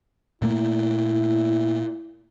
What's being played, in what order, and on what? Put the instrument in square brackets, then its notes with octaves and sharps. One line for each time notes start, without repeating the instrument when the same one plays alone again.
[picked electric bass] A#2 A3 A#3 [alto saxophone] E4